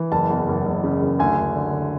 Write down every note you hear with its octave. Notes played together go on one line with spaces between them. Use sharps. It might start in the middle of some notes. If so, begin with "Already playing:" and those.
Already playing: E3
F#1 A5
E2
F#1
F#1
C#3
F#1
D2 G#5
D2
D3
D3